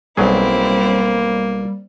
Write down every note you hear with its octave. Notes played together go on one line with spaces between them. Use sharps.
B1 F#3 G3 A#3 C4 E4 G#4